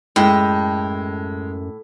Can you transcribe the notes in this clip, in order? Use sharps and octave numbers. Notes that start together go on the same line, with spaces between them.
F#2 A2 G#3 G5